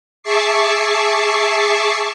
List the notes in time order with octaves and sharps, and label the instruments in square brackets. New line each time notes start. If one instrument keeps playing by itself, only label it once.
[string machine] G#4 E5 A5 C#6 D6 C7